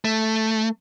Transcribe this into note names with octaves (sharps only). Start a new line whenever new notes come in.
A3